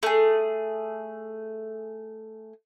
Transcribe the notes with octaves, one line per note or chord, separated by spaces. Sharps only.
A3 G#4